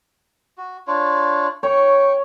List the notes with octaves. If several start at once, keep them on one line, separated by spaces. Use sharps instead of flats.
F#4
D4 F4 C#5
C#5 G5 C#6